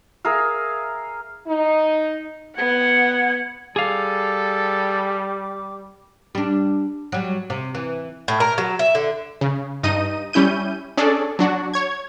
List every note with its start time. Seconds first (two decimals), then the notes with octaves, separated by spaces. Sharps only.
0.25 G#4 A#4 E5 F5
1.46 D#4
2.58 B3 F#5 G#6
3.76 G3 G#4 A4 F5 D6
6.35 G3 D4
7.12 F#3 G3
7.50 C3
7.75 E3
8.28 A2
8.40 A#4
8.58 F#3
8.79 E5
8.95 D3
9.41 C#3
9.83 G2 D#4 D#5 D#7
10.33 G3 C#4 E4 G6 D#7
10.97 C#4 D4 G#4 A4 D5
11.39 F#3 D4 F#4
11.74 C#5 G#6